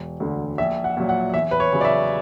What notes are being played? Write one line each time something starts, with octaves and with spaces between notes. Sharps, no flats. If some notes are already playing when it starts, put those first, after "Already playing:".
Already playing: E1
D2 D3
A#1 E5
F#5
A#2 F#3
F#5
E2 E5
B4
C#5
C#3 F#3
D5
E5